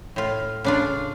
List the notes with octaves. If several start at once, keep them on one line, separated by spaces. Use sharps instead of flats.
A2 F4
C#3 D4 F4